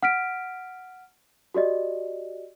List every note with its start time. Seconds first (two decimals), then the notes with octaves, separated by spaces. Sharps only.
0.03 F#5 F6 B6 D7
1.54 F#4 G4 D5 D#5